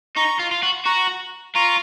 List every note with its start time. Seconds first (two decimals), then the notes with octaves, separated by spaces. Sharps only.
0.16 D#4 A#5 C#6
0.40 F4
0.51 F4
0.63 F#4
0.86 F#4 A#5 C#6
1.55 F4 A#5 C#6